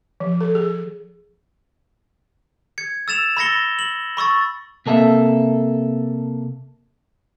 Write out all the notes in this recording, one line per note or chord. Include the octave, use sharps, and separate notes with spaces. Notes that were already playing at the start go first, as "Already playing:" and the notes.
F3
A4
G#4
G#6 C#7
E6 A6 E7 F7
B5 E6 A6 A#6 C#7 G7
F#7
B5 C#6 E6 A6
C3 A#3 A4 D#5 E5